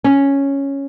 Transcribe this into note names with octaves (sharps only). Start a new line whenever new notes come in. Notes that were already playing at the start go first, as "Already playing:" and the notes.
C#4